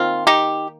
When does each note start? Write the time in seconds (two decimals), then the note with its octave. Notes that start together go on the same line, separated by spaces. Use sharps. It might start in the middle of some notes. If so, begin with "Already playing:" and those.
Already playing: D#3 A#3 C4 F4
0.27 D#4 G4